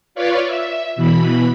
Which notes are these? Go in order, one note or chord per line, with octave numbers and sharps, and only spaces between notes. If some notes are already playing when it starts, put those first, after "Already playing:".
F4 B4 C#5 D5 F5
E5
B2 E3 B5